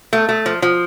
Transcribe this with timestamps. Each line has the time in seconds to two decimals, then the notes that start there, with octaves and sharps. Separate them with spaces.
0.13 A3
0.29 A3
0.46 F3
0.62 F3